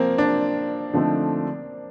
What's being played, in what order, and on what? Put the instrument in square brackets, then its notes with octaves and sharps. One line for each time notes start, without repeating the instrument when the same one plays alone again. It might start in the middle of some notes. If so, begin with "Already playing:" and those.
Already playing: [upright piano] F3 A#3 C4
D4
[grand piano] D3 F3 A3 C4 D#4